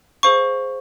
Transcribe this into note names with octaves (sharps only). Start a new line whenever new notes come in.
G#4 C5 F5 C#6